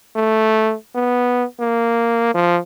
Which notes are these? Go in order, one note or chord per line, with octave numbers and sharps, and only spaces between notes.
A3
B3
A#3
F3